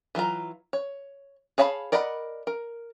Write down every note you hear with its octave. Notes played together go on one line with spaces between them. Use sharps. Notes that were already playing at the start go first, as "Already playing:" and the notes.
E3 F#3 F4 A#5
C#5
G#4 C#5 F5 A5 B5
A#4 D5 D#5 F#5 B5
A#4